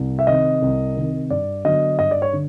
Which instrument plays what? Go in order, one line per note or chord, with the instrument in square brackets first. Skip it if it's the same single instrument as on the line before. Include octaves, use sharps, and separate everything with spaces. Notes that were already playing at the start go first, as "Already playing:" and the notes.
Already playing: [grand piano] C2
E5
C3 D#3 D#5
C2
C3 D#3
G2 D5
D3 F#3 B3 D4 D#5
G2 D#5
D5
C#5
D3